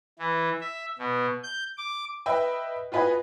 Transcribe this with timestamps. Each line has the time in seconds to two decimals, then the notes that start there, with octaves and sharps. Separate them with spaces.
0.19 E3
0.61 E5
0.99 B2
1.43 G6
1.78 D6
2.26 B4 D#5 E5 G5
2.92 F4 F#4 B4 D#5 G#5